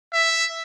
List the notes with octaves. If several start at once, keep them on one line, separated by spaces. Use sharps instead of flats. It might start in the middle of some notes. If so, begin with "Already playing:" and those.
E5